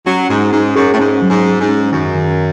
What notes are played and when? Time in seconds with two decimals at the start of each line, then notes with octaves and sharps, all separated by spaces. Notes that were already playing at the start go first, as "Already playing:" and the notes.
0.06 F#3 C#4
0.29 G#2 G#4
0.53 G#2 C#4
0.76 F#2 G#4
0.93 A2
0.99 G#2 C#4
1.22 F#3
1.30 G#2
1.45 C#4
1.61 G#2
1.68 C#4
1.92 F#2 D#3
2.15 D#3